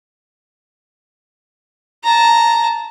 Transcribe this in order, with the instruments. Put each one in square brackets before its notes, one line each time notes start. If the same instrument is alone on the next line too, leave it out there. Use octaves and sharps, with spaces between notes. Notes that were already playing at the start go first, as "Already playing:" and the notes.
[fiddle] A5 A#5